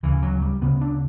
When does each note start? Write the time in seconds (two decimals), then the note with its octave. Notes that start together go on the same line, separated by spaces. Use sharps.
0.03 D2 C#3 E3
0.23 F#3
0.42 G3
0.61 D2 C#3 B3
0.81 D4